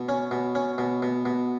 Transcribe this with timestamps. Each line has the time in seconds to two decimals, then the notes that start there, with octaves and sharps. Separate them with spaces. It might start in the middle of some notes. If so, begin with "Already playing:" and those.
Already playing: B2
0.09 C#4
0.31 B2
0.55 C#4
0.78 B2
1.02 B2
1.25 B2